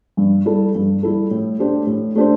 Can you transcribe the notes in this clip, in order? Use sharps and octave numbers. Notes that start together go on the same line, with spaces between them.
G2
G3 E4 A4
G2
G3 E4 A4
A2
A3 D4 G4 C5
A2
A3 D4 G4 C5